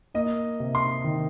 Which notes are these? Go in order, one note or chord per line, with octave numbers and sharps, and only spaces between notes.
A#3 D#5
C3
C6
D#3